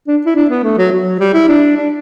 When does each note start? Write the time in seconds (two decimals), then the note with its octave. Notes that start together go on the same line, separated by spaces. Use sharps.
0.08 D4
0.26 E4
0.35 D4
0.50 B3
0.63 A3
0.78 F#3
0.92 F#3
1.20 G3
1.34 E4
1.48 D4
1.76 D4